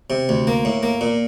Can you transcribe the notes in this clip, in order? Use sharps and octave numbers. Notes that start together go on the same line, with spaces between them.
C3
D2
A#3
A2
A#3
A#2